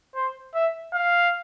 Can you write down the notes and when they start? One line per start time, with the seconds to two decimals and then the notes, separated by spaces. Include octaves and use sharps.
0.15 C5
0.54 E5
0.94 F5